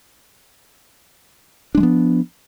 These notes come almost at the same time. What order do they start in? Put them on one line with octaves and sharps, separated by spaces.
D4 G#3 F3 B3